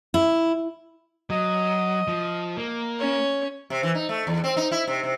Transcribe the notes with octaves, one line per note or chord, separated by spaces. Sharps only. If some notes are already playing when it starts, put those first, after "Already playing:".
E4
F#3 D#5
F3
A#3
C#4 C#5
C3
E3
D#4
A3
E2
C4
D#4
E4
C3
C3